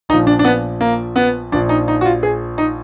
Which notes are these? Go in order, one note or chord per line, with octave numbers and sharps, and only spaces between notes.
A#1 A#2 F3 D#4
D4
D4
B3
A#3
B3
A#1 A#2 F3 D4
D#4
D#4
F#4
F4
G#4
D#4